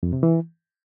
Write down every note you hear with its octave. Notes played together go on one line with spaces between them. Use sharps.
F2
C3
E3